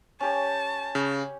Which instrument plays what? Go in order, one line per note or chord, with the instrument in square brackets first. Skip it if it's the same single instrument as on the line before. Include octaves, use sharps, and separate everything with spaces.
[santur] C#4 G4 C#5 [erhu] A5
[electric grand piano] C#3